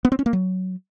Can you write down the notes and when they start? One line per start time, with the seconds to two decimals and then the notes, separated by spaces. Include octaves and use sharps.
0.05 B3
0.12 C4
0.19 C#4
0.26 A#3
0.33 F#3